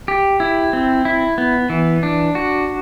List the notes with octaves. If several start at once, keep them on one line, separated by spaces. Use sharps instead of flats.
G4
E4
C4
E4
B3
E3
D4
F#4